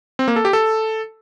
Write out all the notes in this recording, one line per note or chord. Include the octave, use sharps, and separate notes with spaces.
C4
A#3
A4
G4
A4